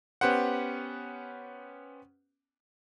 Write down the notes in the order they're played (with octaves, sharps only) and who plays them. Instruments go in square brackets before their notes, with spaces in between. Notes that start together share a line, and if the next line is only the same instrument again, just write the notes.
[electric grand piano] B3 C#4 G4 B4 C5 F#5